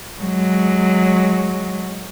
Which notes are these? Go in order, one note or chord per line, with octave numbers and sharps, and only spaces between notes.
F#3 G#3